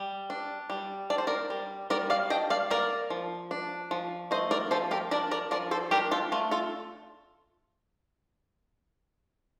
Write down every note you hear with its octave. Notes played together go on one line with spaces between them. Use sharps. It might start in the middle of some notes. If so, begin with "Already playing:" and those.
Already playing: G3
D4
G3
D4 D5
C5
A#4 D5
G3
G3 A#4 D5
D5 F5
D4 D#5 G5
D5 F5
A#3 A#4 D5
F3
D4
F3
A3 C5 D#5
A#4 D5
F3 A4 C5
G4 A#4
D4 A#4 D5
A#4 D5
F3 A#4 D5
A4 C5
D4 G4 A#4
F4 A4
A3 F4
F4 A4